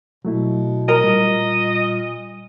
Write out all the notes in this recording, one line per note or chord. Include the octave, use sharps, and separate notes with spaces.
B2 F#3 A3 E4
A#4 D#5
A#2 G3